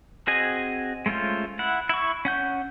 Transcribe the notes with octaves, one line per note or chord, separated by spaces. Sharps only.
C4 F#4 G#4 D#5 G#5
G#3 A3 C#4 F4 C5
E4 F#5
E4 C#6
C#4 F#5 G6